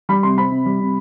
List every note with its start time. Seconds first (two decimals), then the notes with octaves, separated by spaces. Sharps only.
0.09 G3 B5
0.23 C3 C6
0.38 C4 B5
0.51 C3
0.66 G3
0.80 C3